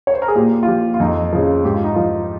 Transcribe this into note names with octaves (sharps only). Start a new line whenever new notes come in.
C#5
C5
A#4
G#4
A#2 G4
F4
F3 G4
F4
F2 D#4
C#3 F3
G#2 G4
F4
D#4
F3 F4